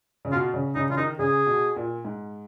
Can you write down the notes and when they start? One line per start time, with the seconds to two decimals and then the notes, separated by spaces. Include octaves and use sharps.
0.25 C#3
0.32 B2 F4
0.54 C#3
0.75 C#3 D#4
0.90 C#3 F4
0.97 D#3 D#4
1.19 C#3 G#4
1.47 B2
1.76 A#2
2.05 G#2